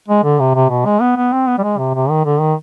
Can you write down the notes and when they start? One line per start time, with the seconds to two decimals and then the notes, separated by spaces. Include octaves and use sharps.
0.08 G#3
0.24 D3
0.40 C3
0.55 C3
0.70 B2
0.86 G#3
1.01 B3
1.17 B3
1.32 C4
1.48 B3
1.58 G3
1.63 G#3
1.78 C3
1.95 C3
2.10 D#3
2.25 D3
2.40 D#3